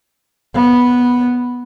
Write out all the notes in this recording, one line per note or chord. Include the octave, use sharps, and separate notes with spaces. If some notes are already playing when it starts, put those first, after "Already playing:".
B3